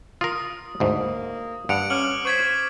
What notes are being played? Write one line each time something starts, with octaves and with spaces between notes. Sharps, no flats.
F4 A#4 D#6
D2 G#2
A#3
G2 F#5 C#7 D7 F7
C#4 D6 F6 F#7
C5 C#6 G#6 B6